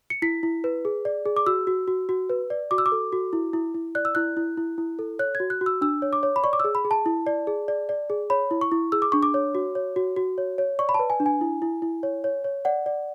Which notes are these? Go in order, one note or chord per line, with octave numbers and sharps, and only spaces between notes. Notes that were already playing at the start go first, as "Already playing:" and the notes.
C#7
E4 B6
E4
B4
G#4
D5
G#4
D6
F#4 E6
F#4
F#4
F#4
B4
D5
F#4 D6
E6
D6
A4
F#4
E4
E4
E4
D5 F#6
E6
E4 F#6
E4
E4
E4
A4
C#5 F#6
G#6
F#4
F#6
F#4
E6
D4 E6
C#5
D6
C#5
B5
D5 C#6
D6
G#4 E6
B5
G#4
A5
E4
D5
G#4
D5
D5
G#4
C#5 B5
E4
C#6
E4
G#4 E6
D6
D4 C#6
D6
C#5
F#4
C#5
F#4
F#4
C#5
C#5
D5 C#6
B5
B4 A5
G#5
D4
G#5
E4
E4
E4
C#5
C#5
C#5
D5 F#5
D5